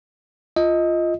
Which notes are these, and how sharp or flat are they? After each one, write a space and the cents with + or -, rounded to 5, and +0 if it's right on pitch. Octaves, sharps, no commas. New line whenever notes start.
F4 -10 D#5 +10